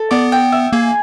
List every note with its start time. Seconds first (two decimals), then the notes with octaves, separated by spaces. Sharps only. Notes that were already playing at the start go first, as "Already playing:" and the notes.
Already playing: A4
0.11 B3 D5
0.32 G5
0.52 E5
0.73 A#3 G#4